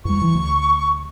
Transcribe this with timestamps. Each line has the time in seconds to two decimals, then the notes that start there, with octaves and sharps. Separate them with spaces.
0.05 E2 G3 C#6
0.22 E3
0.34 D2